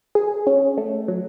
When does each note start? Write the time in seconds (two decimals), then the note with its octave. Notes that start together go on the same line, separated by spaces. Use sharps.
0.15 G#4
0.47 C#4
0.77 A3
1.08 F#3